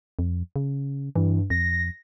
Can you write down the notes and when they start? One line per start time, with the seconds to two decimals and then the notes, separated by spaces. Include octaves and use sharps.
0.19 F2
0.56 C#3
1.16 G2 E3
1.50 F2 A#6